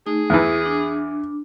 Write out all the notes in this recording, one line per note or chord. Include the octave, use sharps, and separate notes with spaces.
A3 D#4 G#4
E2 E3 E4
D4